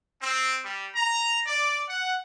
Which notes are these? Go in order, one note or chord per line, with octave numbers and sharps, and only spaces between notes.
C4
G3
A#5
D5
F#5